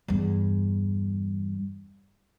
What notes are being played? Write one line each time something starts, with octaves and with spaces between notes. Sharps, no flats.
E2 G2